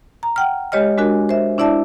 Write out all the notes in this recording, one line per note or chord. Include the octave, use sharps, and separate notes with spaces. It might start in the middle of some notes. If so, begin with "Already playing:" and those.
A#5
F#5 G5 F6
G#3 G4 C#5 D#5 F6
G#3 D4 F#4 A#4 G#5
C5 E5
D4 E4 D5 E5 A5